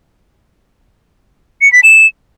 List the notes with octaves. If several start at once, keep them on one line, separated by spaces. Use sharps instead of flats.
C#7
B6
E7